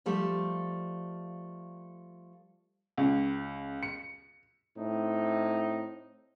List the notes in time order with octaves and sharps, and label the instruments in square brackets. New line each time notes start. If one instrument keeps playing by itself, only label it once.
[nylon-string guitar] F3 G3 A3
[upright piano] C#2
C#7
[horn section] A2 C4 D#4